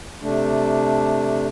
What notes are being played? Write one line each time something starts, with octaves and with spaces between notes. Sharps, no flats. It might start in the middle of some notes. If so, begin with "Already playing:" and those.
C3 A3 D4